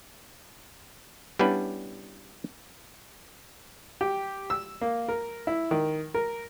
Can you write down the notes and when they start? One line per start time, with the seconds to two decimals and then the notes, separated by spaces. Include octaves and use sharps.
1.39 G3 B3 C#4 D4 E4 B4
4.01 G4
4.50 E6
4.81 A#3
5.09 A#4
5.47 E4
5.71 D#3
6.14 A#4